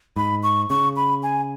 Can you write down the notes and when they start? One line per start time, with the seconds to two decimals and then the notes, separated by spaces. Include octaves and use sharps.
0.16 G#2 B5
0.43 C#6
0.70 C#3 C#6
0.96 B5
1.23 G#5